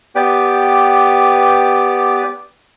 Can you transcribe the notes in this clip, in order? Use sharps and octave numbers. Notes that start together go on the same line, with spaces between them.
B3 G4 B4 D5 G5